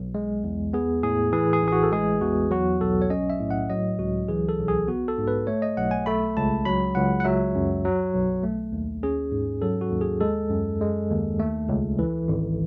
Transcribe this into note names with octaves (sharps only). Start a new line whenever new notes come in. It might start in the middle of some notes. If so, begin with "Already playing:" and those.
Already playing: B1
G#3
E2
B3 G#4
A2 G#4
E3 G#4
G#4
A1
G#4
F#4
A4
G#3 G#4
E2 F#4
F#3 F#4
B1 A4
C#5
C#4 D#5
E5
A2
F#5
F#3 D#5
C#2 F#4
E3 G#4
A4
B1
G#4
B3 F#4
A4
G#2
B4
A3 C#5
D#5
B1 F#5
G#5
A3 B5
C#2 A5
F#3 B5
C#2 F#5
F#5
F#3 E5
F#2
F#3
B1
A3
D#2
C#4 G#4
G#2
F#3 A4
F#4
D#2
G#4
G#3 A4
F#2
G#3
D#2
A3
C#2
E3
G#1